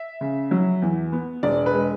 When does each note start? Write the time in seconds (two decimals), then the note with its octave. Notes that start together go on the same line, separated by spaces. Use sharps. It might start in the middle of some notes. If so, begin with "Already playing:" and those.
Already playing: E5
0.21 C#3
0.51 F#3
0.82 E2
1.12 B3
1.43 E1 D5
1.66 B4
1.73 G#3